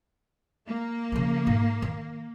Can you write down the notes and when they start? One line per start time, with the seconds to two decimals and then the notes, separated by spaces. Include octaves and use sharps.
0.67 A#3
1.12 C#3 F3
1.47 G#2 D#4
1.82 D#3